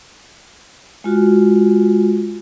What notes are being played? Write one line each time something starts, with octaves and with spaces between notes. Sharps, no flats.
G#3 F4 F#4